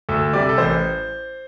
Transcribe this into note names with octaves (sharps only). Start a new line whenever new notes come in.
D2 A4
C3 G3 D5
A4
A1 C5